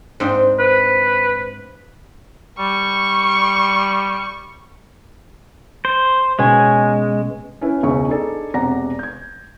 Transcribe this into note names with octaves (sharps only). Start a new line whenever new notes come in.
G#2 C4 D4
B4
G3 C#6
C5
B2 G#3 C#4 G#5
C#4 E4 B4
E1 C#2 C#6
D4 D#4 G#4 A4 D5
E1 C3 D5 F#5 A#5 A#6
G6 G#6